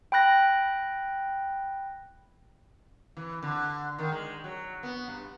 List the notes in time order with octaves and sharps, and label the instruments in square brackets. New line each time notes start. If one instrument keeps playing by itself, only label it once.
[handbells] G5 B5 F#6 A#6
[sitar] E3
D3
D#3
G#3
F#3
B3
G2